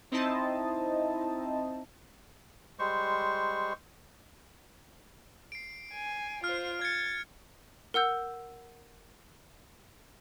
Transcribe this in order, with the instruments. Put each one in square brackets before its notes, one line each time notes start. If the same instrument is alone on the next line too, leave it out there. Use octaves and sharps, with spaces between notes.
[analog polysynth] C4 D#4 E4 C5 D#5 A5
[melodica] G3 G#3 C5 C#6
[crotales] C7 D7
[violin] G#5
[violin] F4 C5 [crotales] F6
[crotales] G#6 C#7 [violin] A6
[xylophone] A#4 F#5 E6 G6